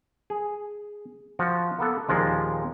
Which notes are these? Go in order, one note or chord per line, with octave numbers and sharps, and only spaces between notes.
G#4
F3 F#4
A#3 B3 A4
D#2 A#2 F3 G#3